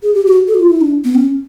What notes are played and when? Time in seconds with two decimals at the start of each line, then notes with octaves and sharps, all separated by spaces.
0.03 G#4
0.15 G4
0.26 F#4
0.48 A4
0.54 F#4
0.60 F4
0.70 E4
0.81 D4
1.05 B3
1.15 C#4